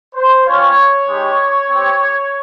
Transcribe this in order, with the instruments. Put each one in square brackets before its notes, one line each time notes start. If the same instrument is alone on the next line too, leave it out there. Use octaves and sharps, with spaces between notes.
[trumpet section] C5
G3 C#4 F4 C#5
G#3 D#4 G4
C4 G4